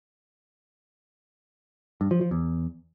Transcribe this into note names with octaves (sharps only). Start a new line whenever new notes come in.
G2
F3
F3
E2